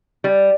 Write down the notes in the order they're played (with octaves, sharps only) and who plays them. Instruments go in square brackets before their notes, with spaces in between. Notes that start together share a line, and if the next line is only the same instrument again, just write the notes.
[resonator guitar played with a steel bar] G3